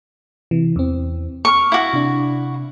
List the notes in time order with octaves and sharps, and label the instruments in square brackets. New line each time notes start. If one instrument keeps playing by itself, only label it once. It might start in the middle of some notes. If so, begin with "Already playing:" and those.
[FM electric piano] C3 E3
E2 E3 C4
[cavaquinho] C#6 [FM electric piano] D6 F6
[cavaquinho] E4 F#4
[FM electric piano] C3 D4